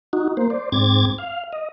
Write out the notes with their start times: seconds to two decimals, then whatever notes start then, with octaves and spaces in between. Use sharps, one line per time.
0.13 D#4 F#4
0.37 A#3 C5
0.50 C5 D5
0.72 G#2 C4 D6 G#6 A6
1.18 F5
1.53 D#5